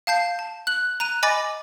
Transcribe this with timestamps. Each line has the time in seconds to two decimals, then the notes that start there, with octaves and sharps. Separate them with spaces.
0.07 F5 A5 G6 C7
0.39 A5
0.67 F#6 F#7
1.00 A#5 F#6 D#7
1.23 D#5 G#5 B5 D6 A6 A#6